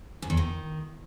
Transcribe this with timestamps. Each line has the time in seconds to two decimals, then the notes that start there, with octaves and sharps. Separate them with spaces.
0.22 F#2
0.30 E2
0.37 D#3